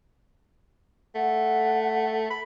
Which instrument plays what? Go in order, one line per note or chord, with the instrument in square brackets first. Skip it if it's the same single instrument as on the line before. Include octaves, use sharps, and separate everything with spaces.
[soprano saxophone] A3 [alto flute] F#5
[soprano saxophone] B5